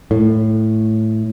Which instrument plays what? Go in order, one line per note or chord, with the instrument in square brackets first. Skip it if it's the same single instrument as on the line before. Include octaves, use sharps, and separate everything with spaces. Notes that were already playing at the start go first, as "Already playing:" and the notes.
[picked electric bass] A2